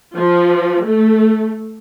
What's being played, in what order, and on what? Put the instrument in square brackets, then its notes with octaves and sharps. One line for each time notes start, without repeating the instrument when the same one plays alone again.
[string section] F3
A3